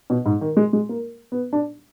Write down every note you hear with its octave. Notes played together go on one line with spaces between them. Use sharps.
B2
G#2
D#3
G#3
G#3
A#3
B3
D4